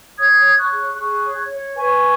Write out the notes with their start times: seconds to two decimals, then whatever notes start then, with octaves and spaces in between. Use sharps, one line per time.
0.18 C#5 D#6 G#6
0.45 C#5
0.58 C#6 F#6
0.71 G#4
0.97 G#4 C#6 F#6
1.24 C#5
1.51 C#5
1.76 B4 G#5 C#6